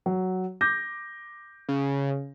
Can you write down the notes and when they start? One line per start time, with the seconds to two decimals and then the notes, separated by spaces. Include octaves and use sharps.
0.06 F#3
0.61 D6 G6 A#6
1.69 C#3